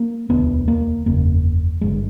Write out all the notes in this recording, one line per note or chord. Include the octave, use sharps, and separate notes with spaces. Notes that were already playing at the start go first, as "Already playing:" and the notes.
Already playing: A#3
E1 D2 D3 B3
A#3
F#1 E2 C#3 A#3
G#1 G2 D3 G#3